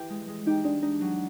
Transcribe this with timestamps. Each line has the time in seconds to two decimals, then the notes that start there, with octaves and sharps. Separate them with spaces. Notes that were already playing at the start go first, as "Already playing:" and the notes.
Already playing: E3 G4
0.10 G#3
0.28 G#3
0.47 D#4 G4
0.64 G#3 D4
0.82 D4 D#4
1.01 F#3